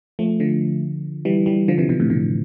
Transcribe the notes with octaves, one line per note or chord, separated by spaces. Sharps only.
F3 A3
D3 F3
E3 G3
E3 G3
D3 F3
C3 E3
B2 D3
A2 C3
B2 D3